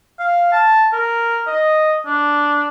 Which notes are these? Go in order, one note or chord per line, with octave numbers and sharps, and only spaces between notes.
F5
A5
A#4
D#5
D4